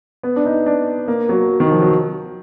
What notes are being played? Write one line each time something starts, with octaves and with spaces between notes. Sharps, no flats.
B3
D4
D#4
D4
A#3
F#3
D#3
F3
F#3